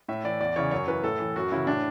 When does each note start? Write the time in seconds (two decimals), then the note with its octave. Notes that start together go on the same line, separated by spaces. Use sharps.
0.08 A2 E5
0.24 E3 D5
0.40 E2 D5
0.56 C#3 E3 C#5
0.71 F#2 C#5
0.87 E3 B4
1.04 A2 A4
1.19 E3
1.36 F#2 F#4
1.52 C#3 E3 E4
1.67 A2 D4